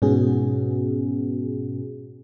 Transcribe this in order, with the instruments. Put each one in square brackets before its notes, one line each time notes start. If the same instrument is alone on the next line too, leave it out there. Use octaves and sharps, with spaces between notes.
[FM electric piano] G#2 B2 B3 C#4 F#4 G#4